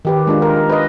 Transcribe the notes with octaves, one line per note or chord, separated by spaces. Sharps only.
D#3 G4 B4
G#3 D4 F4
A#4
B4 D#5